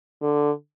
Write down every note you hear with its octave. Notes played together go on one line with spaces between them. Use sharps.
D3